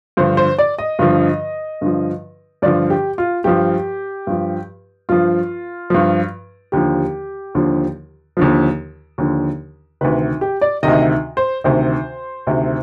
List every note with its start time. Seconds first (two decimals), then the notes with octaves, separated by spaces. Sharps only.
0.17 G2 D3 F3 C5
0.37 C5
0.58 D5
0.78 D#5
0.99 G2 D3 F3
1.81 G2 D3 F3
2.62 G2 D3 F3 D5
2.90 G4
3.18 F4
3.44 G2 F3 G4
4.27 G2 F3
5.09 G2 F3 F4
5.90 G2 F3
6.72 D#2 D3 F3 G4
7.55 D#2 D3 F3
8.37 D#2 D3 F3
9.18 D#2 D3 F3
10.01 D2 C3 D#3 B4
10.41 G4
10.61 D5
10.83 D2 C3 D#3 D#5
11.37 C5
11.64 D2 C3 D#3 C5
12.47 D2 C3 D#3